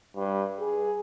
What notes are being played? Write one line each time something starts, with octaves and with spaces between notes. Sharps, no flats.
G2
G#4